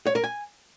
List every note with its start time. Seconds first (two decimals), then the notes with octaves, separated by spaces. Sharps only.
0.07 C#5
0.15 A#4
0.24 G#5